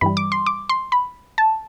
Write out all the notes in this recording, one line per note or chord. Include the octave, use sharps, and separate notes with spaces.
G2 E3 G3 B5
D6
C6
D6
C6
B5
A5